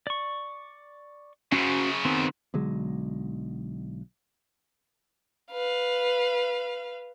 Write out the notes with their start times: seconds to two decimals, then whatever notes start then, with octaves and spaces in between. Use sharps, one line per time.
0.07 D5 C#6
1.52 F#2 C#3 C#4 F#4 C5
2.05 D#3 B3 C4
2.54 B1 D3 F#3 G#3
5.52 B4 F5